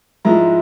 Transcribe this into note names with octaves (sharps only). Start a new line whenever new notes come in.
G#2 F3 G#3 E4 A#5